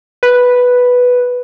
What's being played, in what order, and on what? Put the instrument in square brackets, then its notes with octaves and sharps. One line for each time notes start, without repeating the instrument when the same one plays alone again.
[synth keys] B4